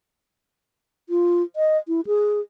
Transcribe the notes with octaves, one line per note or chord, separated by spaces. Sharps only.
F4
D#5
E4
G#4